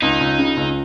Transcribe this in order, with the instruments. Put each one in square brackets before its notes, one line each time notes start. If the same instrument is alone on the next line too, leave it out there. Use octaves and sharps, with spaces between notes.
[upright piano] C#2 [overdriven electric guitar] D#4
[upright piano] C#2
C#3
C#2